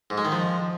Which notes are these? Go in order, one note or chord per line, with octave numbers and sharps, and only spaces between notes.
G#2
G#3
D#3
F3